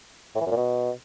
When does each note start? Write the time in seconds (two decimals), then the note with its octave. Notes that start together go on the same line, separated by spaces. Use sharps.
0.36 A2
0.41 E3
0.46 F#2
0.51 A#2
0.57 B2